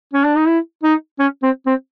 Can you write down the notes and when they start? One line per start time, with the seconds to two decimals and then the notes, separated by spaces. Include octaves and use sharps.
0.13 C#4
0.24 D4
0.36 D#4
0.47 E4
0.83 D#4
1.19 C#4
1.43 C4
1.66 C4